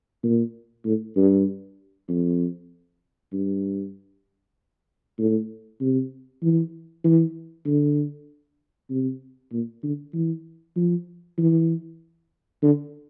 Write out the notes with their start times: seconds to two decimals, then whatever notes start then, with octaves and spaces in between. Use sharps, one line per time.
0.23 A#2
0.85 A2
1.16 G2
2.09 F2
3.33 G2
5.19 A2
5.81 C3
6.43 E3
7.04 E3
7.67 D3
8.90 C3
9.52 A#2
9.83 D3
10.14 E3
10.76 F3
11.38 E3
12.63 D3